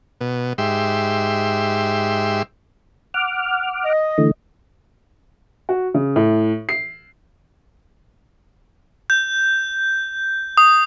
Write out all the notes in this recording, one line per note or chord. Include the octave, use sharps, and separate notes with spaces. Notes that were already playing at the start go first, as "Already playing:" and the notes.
B2
G#2 G4 E5 C6
F#5 D6 F6
D#5
D3 E3 A3
F#4
C#3
A2
C7
G6
D#6